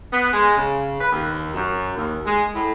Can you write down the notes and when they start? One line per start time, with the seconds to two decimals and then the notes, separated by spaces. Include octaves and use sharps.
0.12 B3
0.33 G#3
0.56 C#3
1.00 B4
1.12 D#2
1.54 F#2
1.96 D#2
2.26 G#3
2.54 A2